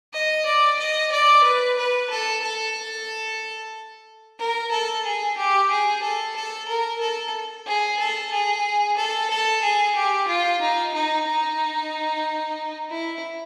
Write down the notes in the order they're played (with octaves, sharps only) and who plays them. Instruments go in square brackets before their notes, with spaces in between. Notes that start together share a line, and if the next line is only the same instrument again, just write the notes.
[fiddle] D#5
D5
D#5
D5
B4
B4
A4
A4
A#4
A4
G#4
G4
G#4
A4
A4
A#4
A4
G#4
A4
G#4
A4
A4
G#4
G4
F4
D#4
D#4
D#4
E4